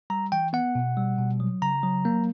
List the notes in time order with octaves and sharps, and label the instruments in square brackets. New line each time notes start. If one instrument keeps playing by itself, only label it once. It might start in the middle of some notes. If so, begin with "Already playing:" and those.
[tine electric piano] G3 A#5
E3 G5
B3 F#5
B2
G3
B2
F#3
C#3 A#5
F#3
A#3